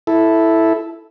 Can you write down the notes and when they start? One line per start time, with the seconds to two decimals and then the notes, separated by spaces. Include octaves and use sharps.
0.07 E4 A4